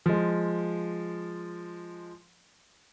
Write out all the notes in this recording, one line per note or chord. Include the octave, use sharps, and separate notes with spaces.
F3 G#3